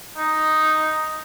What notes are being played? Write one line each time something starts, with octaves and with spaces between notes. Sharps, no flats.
D#4